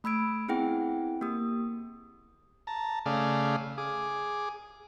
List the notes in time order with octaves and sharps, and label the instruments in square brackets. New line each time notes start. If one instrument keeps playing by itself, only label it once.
[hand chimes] A3 B5 E6 G#6 D7
B3 C4 E4 G#4 F#5 G5
A#3 G4 D#6
[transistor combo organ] A5 A#5
C#3 A3 G#4 D5 F5
G#4 D6